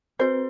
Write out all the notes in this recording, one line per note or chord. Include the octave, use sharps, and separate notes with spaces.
C4 F#4 B4 C5